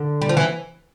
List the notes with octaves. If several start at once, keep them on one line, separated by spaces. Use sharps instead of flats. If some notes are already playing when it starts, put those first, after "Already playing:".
Already playing: D3
G3
F3
E3